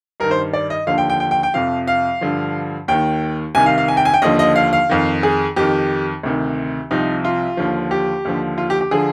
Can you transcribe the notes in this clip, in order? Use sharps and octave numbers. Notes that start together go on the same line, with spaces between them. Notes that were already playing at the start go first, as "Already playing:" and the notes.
G2 D#3 A#4
C5
D5
D#5
D#2 D3 F3 F5
G5
G5
G5
G5
G5
F2 C3 F3 F5
F5
G2 D3 F3
D#2 D#3 G5
C2 C3 D#3 G#5
F5
F5
G#5
G5
G#5
G5
D#2 D3 F3 D#5
D#5
F5
F5
F2 D#3
G#4
F2 D#3 G4
D2 C3 D#3
C2 C3 F3 D#4
F4
D#2 D3 F3
G4
D#2 D3 F3
F4
G4
G4
D3 F3 G#4